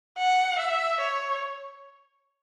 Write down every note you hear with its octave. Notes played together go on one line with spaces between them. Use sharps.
F#5
E5
C#5